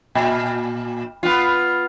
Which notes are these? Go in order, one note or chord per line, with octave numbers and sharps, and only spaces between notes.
A#2
B3 F4